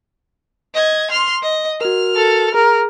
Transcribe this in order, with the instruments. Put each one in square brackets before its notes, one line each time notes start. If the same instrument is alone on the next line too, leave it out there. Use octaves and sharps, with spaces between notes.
[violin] D#5 G#6
C6 F6
D#5
[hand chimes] F#4 A#4 [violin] F6
[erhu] A4
[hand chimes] G#4 [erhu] A#4